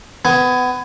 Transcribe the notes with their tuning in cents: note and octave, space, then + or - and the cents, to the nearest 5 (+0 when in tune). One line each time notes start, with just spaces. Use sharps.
B3 +25 G#5 +0